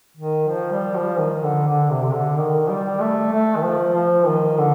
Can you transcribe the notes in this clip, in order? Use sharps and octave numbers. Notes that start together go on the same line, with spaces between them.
D#3
F3
G3
F3
D#3
D3
D3
C3
C3
D3
D#3
G3
A3
A3
D#3
F3
F3
D#3
D3